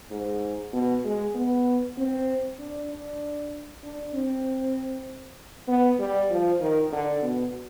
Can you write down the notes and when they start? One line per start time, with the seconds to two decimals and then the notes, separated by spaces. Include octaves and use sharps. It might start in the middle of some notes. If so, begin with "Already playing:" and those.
0.11 G#2
0.73 B2
1.04 G#3
1.35 B3
1.98 C4
2.59 D4
2.90 D4
3.83 D4
4.14 C4
5.68 B3
5.99 G3
6.30 F3
6.61 D#3
6.92 D3
7.23 B2